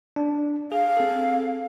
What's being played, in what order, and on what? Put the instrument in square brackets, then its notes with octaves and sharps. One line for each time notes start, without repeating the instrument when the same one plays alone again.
[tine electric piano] D4
[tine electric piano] G#4 [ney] F5
[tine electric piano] C4 A4